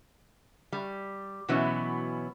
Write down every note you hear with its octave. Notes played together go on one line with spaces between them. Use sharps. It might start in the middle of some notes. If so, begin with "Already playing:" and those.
G3
B2 E3 F#3 B3 C#4 E4